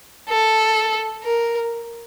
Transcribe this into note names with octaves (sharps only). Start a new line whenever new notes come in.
A4
A#4